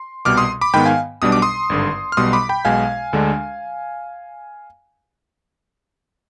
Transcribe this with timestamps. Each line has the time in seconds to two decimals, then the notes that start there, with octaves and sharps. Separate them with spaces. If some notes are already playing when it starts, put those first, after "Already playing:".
Already playing: C6
0.25 C2 B2 G3 D6 F6
0.37 C6 D#6
0.61 B5 D6
0.74 G#2 D#3 B3 G5 B5
0.85 F5 G#5
1.22 B1 B2 G3 D4 D#6
1.32 D6
1.42 C6 D#6
1.70 G#1 G2 D3
2.12 F6
2.17 B1 B2 G3 C6 D#6
2.33 B5 D6
2.49 G5 B5
2.65 B1 B2 G#3 F5 G#5
3.13 D2 D3 G#3 D4